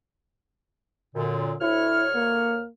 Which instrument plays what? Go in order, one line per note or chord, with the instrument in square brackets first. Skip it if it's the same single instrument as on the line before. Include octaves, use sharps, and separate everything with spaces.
[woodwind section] F#2 A#2 D3
[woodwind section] D2 C#5 F6 [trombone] E4
[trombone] A#3